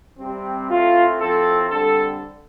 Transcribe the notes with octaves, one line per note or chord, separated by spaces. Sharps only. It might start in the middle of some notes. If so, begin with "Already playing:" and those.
C3 G3 C4
A2 A3 C4 F4
A2 F3 C4 A4
D3 G3 C4 A4